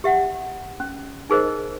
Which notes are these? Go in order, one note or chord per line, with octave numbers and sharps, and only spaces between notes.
G4 E5 F#5
C#4
D#4 G#4 A#4 C5 D#5